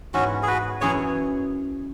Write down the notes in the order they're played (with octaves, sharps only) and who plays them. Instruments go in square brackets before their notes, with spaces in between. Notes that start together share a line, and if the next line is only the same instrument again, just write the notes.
[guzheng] G#2 E3 B3 E4 [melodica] C#4 F#4
[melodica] G#4
F#4 B4
[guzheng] F#2 E3 C#4 E4 [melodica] G#4 C#5